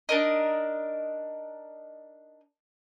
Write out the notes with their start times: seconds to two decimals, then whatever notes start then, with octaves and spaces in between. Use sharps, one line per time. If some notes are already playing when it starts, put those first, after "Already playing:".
0.09 D4 D#4 A#4 D#5